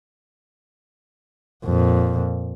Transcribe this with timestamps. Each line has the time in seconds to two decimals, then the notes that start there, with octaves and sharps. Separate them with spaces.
1.65 F2 A#2